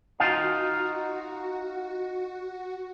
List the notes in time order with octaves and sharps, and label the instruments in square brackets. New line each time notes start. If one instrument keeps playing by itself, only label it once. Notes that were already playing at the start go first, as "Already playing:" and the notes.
[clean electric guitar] D#4 F4 F5 [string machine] F#4